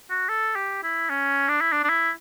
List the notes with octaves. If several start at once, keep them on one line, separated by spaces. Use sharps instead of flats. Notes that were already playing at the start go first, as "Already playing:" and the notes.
F#4
A4
G4
E4
C#4
D4
E4
D4
D4
E4